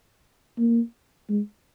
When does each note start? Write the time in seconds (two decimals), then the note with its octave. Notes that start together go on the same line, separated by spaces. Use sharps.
0.59 A#3
1.29 G#3